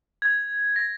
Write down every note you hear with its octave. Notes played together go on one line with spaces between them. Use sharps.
G#6
A#6